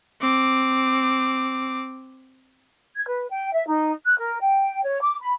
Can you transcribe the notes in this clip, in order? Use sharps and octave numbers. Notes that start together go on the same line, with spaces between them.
C4 D6
G#6
B4
G5
E5
D#4
F#6
A#4
G5
C#5
D6
B5